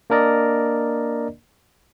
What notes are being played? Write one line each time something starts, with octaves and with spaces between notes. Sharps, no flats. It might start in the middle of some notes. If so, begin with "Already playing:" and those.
A#3 D4 A#4 D5 D#5